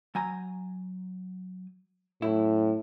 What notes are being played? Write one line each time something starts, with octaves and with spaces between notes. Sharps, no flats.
F#3 G#5 A#5
F#2 A2 E4